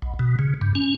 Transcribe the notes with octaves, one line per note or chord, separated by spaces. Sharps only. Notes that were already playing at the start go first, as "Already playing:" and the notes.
B1
B2
C#3
G2
C#4